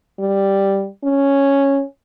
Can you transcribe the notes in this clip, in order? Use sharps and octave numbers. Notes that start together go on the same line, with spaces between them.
G3
C#4